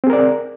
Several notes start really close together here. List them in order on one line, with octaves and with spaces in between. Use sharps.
C4 G#4 A#4 D5